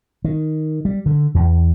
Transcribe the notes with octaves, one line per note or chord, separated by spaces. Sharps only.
D#3
G3
D3
E2